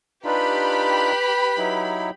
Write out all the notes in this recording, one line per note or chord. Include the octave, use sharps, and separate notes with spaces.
D4 D#4 F4 G4 B4 B5
F#3 D#4 E4